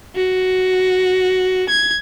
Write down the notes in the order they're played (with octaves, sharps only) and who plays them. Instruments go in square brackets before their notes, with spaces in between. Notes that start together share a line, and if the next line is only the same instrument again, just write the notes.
[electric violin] F#4
G#6